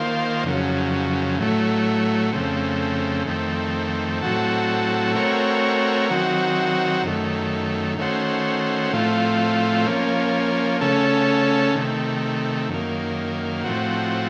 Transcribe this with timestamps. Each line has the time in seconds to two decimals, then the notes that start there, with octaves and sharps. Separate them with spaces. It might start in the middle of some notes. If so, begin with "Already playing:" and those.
Already playing: D#3 A#3 F4 C5
0.44 F2 C#3 F#3
1.38 A2 F#3 A3
2.33 F2 C#3 A3 C4
3.27 F2 D#3 A3 C4
4.21 A2 F#3 C4 F#4 A4
5.15 A3 C4 F#4 A#4 C#5
6.09 D#3 F#3 C4 F#4
7.03 F#2 D#3 A3
7.98 D#3 A3 C#4 F#4 C5
8.92 A2 F3 A3 C4 F4
9.86 F3 A#3 C#4
10.81 C#3 A3 C#4 A4
11.75 C3 D#3 A3
12.69 F#2 D#3 A#3
13.64 A2 F3 C4 F#4